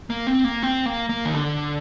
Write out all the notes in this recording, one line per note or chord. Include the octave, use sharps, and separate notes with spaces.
A#3
C4
A#3
C4
A#3
A#3
D#3
D3